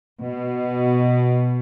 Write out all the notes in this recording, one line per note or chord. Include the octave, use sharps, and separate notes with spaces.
B2